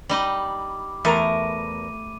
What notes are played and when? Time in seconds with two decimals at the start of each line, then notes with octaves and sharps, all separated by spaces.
0.09 G3 D#4 D#5 B5 D6
1.05 E2 A3 A#4 A#5 D6 D#7